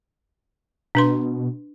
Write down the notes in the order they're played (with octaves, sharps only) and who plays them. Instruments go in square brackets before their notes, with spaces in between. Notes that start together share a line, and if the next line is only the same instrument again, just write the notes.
[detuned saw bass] B2 [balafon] D4 B4 C6